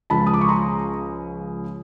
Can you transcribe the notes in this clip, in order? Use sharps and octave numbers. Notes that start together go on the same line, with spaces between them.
C#2 C#3 F3 A5 B5
D#6
D6
C#6
A#5 C6